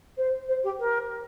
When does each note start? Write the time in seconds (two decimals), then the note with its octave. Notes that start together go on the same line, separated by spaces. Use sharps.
0.17 C5
0.48 C5
0.63 G4
0.79 A#4